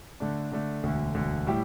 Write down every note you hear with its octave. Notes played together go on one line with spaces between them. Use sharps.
D3 A3 D4
D3 A3 D4
E1 D2 D3
E1 D2 D3
A2 G3 E4 G4